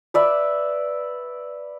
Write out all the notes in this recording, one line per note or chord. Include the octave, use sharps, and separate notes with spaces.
B4 D5 E5